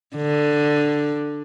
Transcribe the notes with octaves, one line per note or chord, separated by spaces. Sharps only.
D3